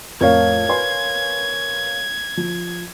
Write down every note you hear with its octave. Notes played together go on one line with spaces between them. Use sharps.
F2 A2 A#4 C#5 F5 G#6
B4 G#5 C6
F3